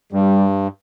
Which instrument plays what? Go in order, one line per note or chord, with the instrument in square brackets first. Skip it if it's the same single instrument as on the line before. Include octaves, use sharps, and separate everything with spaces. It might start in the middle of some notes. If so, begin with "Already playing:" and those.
[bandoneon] G2 [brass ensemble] G3